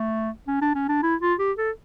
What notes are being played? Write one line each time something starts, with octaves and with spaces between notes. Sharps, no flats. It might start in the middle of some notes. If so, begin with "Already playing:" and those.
Already playing: A3
C#4
D4
C#4
D4
E4
F4
G4
A4